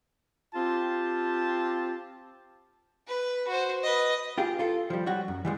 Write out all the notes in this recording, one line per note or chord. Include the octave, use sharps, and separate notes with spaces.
C4 F4 G4 A5
B4
F#4 C5
B4 D#5
F4 G4 G#4
F4 A4
F3 G3
F#3 G3 F#4
F#2
E3 G3 G#3